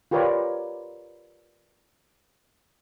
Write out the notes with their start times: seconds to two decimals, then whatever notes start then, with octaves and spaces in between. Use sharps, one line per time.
0.11 F4 G4 A#4 B4 C#5 D5